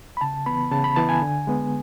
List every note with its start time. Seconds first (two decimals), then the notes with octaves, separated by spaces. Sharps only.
0.17 B5
0.21 C#3 A5
0.46 E3 B3 B5
0.71 C#3 A5
0.84 B5
0.96 E3 B3 A5
1.09 G#5
1.22 D3
1.47 G#3 B3